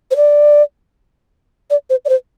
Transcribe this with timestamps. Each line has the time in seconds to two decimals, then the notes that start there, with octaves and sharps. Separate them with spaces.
0.11 C5
0.16 D5
1.70 D5
1.90 C5
2.05 D5
2.09 C5